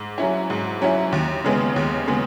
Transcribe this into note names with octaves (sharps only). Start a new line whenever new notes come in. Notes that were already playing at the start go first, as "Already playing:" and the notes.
Already playing: G#2
F#3 C#4 E4
G#2
F#3 C#4 E4
D#2
C#3 G#3 B3
D#2
C#3 G#3 B3